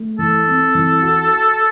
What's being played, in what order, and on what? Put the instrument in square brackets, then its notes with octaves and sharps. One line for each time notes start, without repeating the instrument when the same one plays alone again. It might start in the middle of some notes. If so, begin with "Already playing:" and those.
Already playing: [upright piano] A3
[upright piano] E3 [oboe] A4
[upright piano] C4
E3
F#4